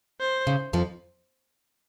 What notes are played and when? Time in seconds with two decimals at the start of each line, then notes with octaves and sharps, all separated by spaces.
0.20 C5
0.47 C#3
0.73 F2 F3